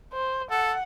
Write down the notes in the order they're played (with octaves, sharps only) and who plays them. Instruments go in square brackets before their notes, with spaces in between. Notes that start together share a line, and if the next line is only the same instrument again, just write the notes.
[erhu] C5
[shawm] A4 [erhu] F#5